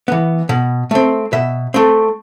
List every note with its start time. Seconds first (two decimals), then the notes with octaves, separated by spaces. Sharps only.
0.08 E3 B3
0.49 B2
0.91 A3 C4
1.33 B2 E5
1.74 A3 C4